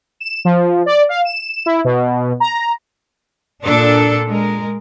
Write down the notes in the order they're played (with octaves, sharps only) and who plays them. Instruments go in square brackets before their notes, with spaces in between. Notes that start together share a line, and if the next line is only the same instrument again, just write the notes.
[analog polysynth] E7
F3
D5
F5
E7
E4
B2
A#5
[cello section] A#2 D4 A4
G#3 A#4